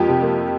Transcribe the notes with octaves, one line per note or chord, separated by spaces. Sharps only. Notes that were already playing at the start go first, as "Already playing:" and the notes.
Already playing: F2 F3 A#3 G4
C3
A#3